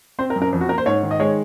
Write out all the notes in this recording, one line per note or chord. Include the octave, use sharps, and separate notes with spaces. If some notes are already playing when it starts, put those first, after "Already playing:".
C4 C5
A#4
F#2
A#4
F2
F#4
A#3 A#4
C5
G#2 C#5
D#3
D#5
G#3 C#5